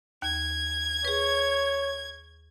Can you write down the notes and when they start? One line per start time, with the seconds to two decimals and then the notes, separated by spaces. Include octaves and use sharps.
0.22 D#2 G#6
1.05 G#4 B4 C#5